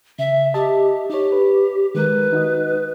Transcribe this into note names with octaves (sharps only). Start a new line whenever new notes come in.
C#3 E5
G4 D#5 E5 A5
D#4 G4 C#5
B4
D#3 G#3 A#4 B4
D#4 F#4 D#5